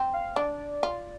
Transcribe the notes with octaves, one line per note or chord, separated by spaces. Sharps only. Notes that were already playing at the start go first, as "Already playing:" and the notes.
Already playing: C4
F5
D4 D5
F4